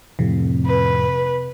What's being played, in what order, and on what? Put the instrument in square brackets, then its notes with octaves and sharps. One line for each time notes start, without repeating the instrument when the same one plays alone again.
[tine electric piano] F2 A2 [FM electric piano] C3
[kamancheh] B4